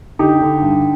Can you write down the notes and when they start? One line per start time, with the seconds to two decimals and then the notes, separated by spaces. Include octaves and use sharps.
0.19 D3 D#4 G4
0.41 D3
0.62 G2